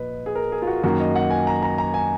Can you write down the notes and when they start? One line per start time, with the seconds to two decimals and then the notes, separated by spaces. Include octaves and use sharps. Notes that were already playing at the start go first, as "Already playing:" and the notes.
Already playing: A#2 F3 B4 D#5
0.26 G#4
0.35 A#4
0.52 G#4
0.62 F4
0.67 F#4
0.83 F#2 D#3 A#3 F#4
1.00 D#5
1.15 F#5
1.30 G#5
1.47 A#5
1.63 A#5
1.78 A#5
1.94 G#5